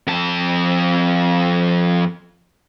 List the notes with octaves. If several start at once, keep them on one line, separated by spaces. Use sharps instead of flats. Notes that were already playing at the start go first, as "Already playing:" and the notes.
F2 A5